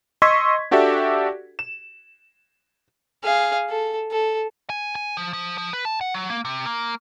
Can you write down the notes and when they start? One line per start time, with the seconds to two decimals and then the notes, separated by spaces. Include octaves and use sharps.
0.22 D#5 C6 C#6 E6 G#6 B6
0.71 D4 F#4 G4 A4 D5 E5
1.59 E7
3.24 G#4 F5
3.69 A4
4.11 A4
4.70 G#5
4.95 G#5
5.17 F3
5.33 F3
5.58 F3
5.73 B4
5.85 A5
6.01 F#5
6.15 F#3
6.30 A#3
6.45 C3
6.66 A#3